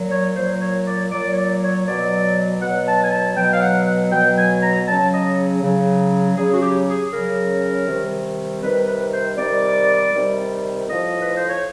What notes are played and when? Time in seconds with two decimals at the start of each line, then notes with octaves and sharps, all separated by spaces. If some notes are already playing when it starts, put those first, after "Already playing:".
Already playing: A#2 F#3
0.12 C#5
0.36 A#2 F#3 C5
0.62 C#5
0.87 D5
1.11 A#2 F#3 D5
1.32 C#5
1.37 D5
1.62 C#5
1.87 B2 F#3 D5
2.61 B2 F#3 F#5
2.87 A5
3.04 G#5
3.11 A5
3.37 B2 F#3 G5
3.53 F5
3.62 F#5
3.87 F#5
4.12 B2 F#3 G5
4.37 G#5
4.63 A#5
4.88 C#3 F#3 A5
5.13 D#5
5.63 C#3 F#3
6.37 C#3 F#3 G#4
6.53 F#4
6.62 G4
6.88 G#4
7.13 C#3 F#3 A#4
7.87 C3 D#3 G3
8.63 C3 D#3 G3 B4
8.88 B4
9.13 C5
9.37 C3 D#3 G3 D5
10.12 C3 D#3 G3
10.88 A2 F3 D#5
11.21 B4
11.36 C5
11.49 C#5